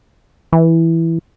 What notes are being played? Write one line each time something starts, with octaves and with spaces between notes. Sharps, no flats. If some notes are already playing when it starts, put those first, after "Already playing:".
E3